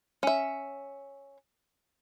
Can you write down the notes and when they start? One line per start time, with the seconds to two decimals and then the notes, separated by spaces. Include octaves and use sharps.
0.23 C#4 E5